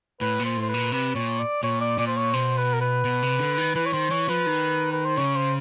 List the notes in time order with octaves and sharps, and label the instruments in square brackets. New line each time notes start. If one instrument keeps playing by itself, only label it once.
[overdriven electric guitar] A2 [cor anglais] B4
[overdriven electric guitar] A#2
[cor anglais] C5
[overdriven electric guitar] A2 [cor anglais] C5
[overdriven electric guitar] A#2 [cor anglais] B4
[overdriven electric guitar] C3 [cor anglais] B4
[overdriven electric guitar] A#2 [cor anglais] C#5
[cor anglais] D5
[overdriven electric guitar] A#2 [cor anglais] C#5
[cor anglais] D5
[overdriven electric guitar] A#2 [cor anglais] D5
[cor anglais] C5
C#5
[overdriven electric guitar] B2 [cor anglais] C5
[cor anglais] B4
A#4
B4
[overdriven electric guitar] B2
C3
D3
D#3
[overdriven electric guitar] E3 [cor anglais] B4
[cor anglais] C#5
[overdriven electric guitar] D#3 [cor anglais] C5
[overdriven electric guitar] E3 [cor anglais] C#5
[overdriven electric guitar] F3 [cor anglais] B4
[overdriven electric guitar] D#3
[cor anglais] B4
C5
[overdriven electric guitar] C#3 [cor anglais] C#5
[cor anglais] C5